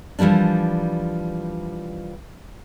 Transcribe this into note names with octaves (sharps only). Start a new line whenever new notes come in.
E3 F3 G3 A#3 D4